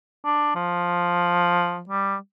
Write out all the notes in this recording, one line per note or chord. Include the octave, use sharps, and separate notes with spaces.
D4
F3
G3